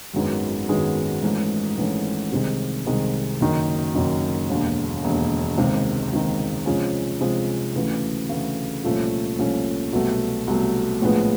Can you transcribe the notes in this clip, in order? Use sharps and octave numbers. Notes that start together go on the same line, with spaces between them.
G#1 F#2 D#3 G#3 B3
G#1 F#2 D#3 G#3 B3
G#1 G#2 E3 A3 C#4
G#1 G#2 E3 A3 C#4
C2 C3 D#3 G#3
C2 C3 D#3 G#3
F#1 F#2 D#3
F#1 F#2 D#3
E1 D#2 D3
E1 D#2 D3
C#2 C3 D#3
C#2 C3 D#3
C3 F3 G#3 C#4
C3 F3 G#3 C#4
D2 C#3 E3 A3
D2 C#3 E3 A3
C2 A#2 F3 A3 C#4
C2 A#2 F3 A3 C#4
C2 B2 F#3 A3
C2 B2 F#3 A3
A#1 A2 F3 G#3 B3